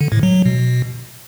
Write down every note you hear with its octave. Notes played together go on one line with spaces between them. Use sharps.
D3
A2
F#3
F#3
B2